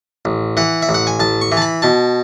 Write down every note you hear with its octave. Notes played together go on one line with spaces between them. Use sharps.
A1
E3 F#5
E5
A1
F#5
G#5
A1 A5
C#6
E3
A5
B5
B2 A5